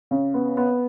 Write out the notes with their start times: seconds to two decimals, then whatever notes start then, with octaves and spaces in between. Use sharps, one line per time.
0.11 C#3
0.34 B3
0.57 B3